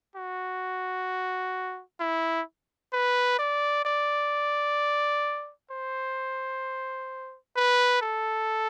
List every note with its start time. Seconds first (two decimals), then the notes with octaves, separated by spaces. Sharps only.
0.16 F#4
2.00 E4
2.93 B4
3.39 D5
3.85 D5
5.71 C5
7.56 B4
8.02 A4